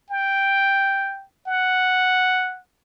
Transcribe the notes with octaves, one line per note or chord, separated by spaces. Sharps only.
G5
F#5